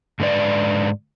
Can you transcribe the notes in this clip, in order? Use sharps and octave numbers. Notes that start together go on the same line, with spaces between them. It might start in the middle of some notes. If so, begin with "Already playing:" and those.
G#2 D3 G#3 B4 D5